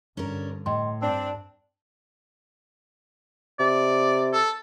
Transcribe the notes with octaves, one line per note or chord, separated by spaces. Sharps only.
G2 D3 C#4 D4 A#4
A2 D#5 G5 C6
G2 C4 D4 A5
C3 D5
A4